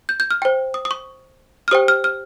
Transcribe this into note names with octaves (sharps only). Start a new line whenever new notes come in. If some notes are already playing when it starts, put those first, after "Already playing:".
G6
G6
F6
C5 G5
D#6
D#6
C#6
F6
G4 C5 G5 D#6
F6
F6